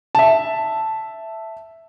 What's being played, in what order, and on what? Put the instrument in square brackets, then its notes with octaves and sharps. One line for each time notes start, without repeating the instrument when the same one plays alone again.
[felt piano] E5 A5